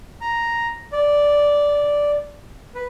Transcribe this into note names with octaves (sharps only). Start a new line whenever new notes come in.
A#5
D5
B4